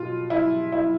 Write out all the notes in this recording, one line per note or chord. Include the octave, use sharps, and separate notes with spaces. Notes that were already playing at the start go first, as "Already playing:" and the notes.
Already playing: B2 F4
E4
E4